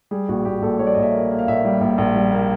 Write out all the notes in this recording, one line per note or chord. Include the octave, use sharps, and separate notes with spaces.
G3 G#4
A#1 F#4
A#1 G4
A#1 A4
G3 C#5
D5
A#1 D#5
E5
A#3
A#3
F5
A#1 E5
G3
A#1
A#1
G3
A#3